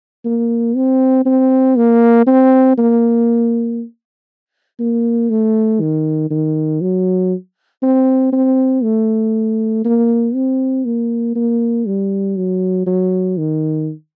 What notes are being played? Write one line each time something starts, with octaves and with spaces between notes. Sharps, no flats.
A#3
C4
C4
A#3
C4
A#3
A#3
A3
D#3
D#3
F#3
C4
C4
A3
A#3
C4
A#3
A#3
G3
F#3
F#3
D#3